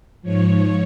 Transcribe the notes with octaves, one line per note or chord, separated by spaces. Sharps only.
G#2 F3 C#5